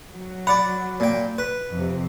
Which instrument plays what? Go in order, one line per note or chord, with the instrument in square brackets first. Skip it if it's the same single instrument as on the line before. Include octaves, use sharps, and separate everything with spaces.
[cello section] F#3
[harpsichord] D5 F#5 [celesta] B5
[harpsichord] A#2 G5
B4
[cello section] F2 C3